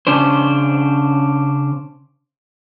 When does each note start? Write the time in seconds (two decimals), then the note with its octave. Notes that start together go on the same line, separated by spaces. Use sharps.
0.07 C#3 C#4 D4 C5